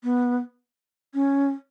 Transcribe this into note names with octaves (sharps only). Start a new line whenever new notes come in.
B3
C#4